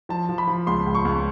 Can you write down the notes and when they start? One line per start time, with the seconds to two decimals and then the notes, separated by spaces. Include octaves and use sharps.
0.09 F3 A5
0.29 F3
0.38 B5
0.48 F3
0.67 C#2 C6
0.86 C#2
0.95 C#6
1.05 C#2